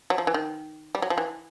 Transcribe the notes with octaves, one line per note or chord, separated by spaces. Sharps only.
F#3
F3
E3
D#3
G3
F#3
F3
E3